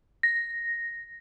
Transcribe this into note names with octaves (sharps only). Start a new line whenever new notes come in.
A#6